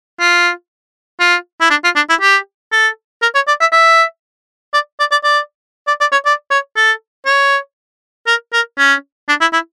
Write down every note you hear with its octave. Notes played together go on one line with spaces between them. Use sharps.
F4
F4
E4
D4
F4
D4
E4
G4
A4
A#4
C#5
D5
E5
E5
D5
D5
D5
D5
D5
D5
C#5
D5
C#5
A4
C#5
A#4
A#4
C#4
D4
E4
E4